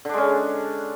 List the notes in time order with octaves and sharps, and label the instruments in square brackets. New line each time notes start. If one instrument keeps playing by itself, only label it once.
[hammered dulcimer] D3
D4
G#3
C#4